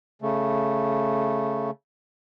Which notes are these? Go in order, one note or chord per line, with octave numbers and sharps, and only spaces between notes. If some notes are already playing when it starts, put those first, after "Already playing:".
C#3 A3